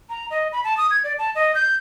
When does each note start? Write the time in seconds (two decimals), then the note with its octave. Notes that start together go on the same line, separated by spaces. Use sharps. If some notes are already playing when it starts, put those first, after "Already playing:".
0.10 A#5
0.31 D#5
0.52 B5
0.64 A5
0.77 D#6
0.91 G#6
1.04 D5
1.19 A5
1.35 D#5
1.55 G6